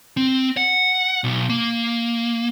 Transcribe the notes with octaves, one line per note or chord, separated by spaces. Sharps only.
C4
F#5
B1
A#3